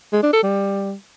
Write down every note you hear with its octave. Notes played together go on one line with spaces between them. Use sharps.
G#3
D4
A4
G3